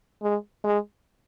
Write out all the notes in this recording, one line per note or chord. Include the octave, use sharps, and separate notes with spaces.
G#3
G#3